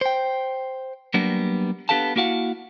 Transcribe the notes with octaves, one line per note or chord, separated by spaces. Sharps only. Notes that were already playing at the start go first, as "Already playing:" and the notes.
C5 G5
F#3 G3 A#3 B3 D4
B3 D4 G4 A4 F5 A5
A#3 E4 F#4 F5 F#5